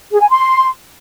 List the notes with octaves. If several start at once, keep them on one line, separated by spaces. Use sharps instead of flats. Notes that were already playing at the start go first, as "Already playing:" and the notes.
G#4
G#5
C6